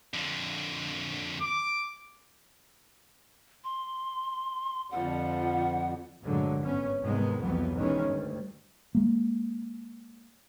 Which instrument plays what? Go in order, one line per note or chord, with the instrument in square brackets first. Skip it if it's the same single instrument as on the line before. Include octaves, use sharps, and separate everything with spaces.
[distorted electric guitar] F2 D3
[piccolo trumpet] D6
[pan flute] C6
[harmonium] F2 [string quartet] D3 F3 G3 [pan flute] F#5
[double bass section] D2 G2 A#2 D3 F#3 G#3
G#1 B3 C#4
E2 G#2 C3 D#3 G#3 B3
C2 F2 E3 F#3 B3
B2 D#3 E3 G#3 C#4
D2 G2
[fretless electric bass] G#3 A#3